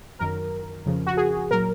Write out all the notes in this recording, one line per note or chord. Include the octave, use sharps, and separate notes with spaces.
F#2 D#3 F#3 A#4
F2 C#3 F3
F#4
G#4
A#2 F#3 A#4